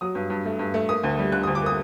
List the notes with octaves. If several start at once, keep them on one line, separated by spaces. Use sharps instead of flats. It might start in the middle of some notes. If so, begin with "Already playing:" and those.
F#3 D#6
G2
G2
A3
G2
A3
A#3 D#6
D2
G3
D3 F#6
D2 D#6
D6
A#3 D#6